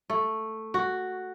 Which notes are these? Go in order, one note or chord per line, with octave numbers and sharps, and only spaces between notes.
A3
F#4